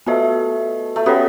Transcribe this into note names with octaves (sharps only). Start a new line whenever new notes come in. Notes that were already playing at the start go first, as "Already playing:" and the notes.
A3 B3 F#4 B4 D#5
A3
B3 C#4 F#4 A4 C#5